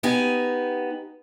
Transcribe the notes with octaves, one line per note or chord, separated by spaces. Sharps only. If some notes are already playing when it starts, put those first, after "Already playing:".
B3 D#4 G4 G#5